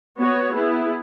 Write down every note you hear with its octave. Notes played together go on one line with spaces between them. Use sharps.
B3 F#4 C#5
B3 E4 G#4